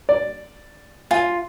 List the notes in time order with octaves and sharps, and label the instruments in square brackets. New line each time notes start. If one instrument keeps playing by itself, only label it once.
[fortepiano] D5
[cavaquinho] F4 [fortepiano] G#5